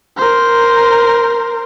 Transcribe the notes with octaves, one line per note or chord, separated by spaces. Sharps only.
A#4 C5